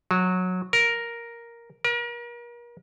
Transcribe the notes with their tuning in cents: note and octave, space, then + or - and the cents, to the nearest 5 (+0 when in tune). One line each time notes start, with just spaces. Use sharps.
F#3 -15
A#4 +5
A#4 +40